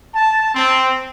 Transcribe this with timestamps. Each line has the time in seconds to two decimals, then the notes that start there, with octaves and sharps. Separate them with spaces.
0.14 A5
0.53 C4